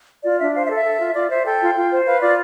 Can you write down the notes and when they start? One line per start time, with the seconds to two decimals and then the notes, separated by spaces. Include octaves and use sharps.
0.25 F4 D5
0.39 D4 E5
0.55 C5 F5
0.65 E5
0.70 A4
0.75 E5
0.85 A4
1.00 F4
1.15 F4 D5
1.30 C5 E5
1.46 A4 G5
1.61 F4
1.76 F4
1.91 C5
2.07 B4 F5
2.21 F4 D5